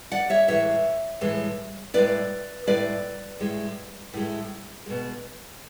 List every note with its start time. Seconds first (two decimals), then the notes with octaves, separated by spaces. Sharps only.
0.12 D5 F#5
0.30 C#5 E5
0.48 A2 E3 G#3 C#5 E5
1.21 A2 E3 G#3
1.94 A2 G#3 B4 D5
2.67 A2 G#3 B4 D5
3.40 A2 G#3
4.14 A2 G#3
4.86 B2 G#3